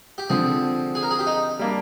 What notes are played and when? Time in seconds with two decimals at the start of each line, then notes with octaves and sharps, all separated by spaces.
0.18 G4
0.30 D3 F3 C4 G#4
0.95 G#4
1.03 A#4
1.11 G#4
1.19 G4
1.27 D#4
1.59 G3 A#3 D4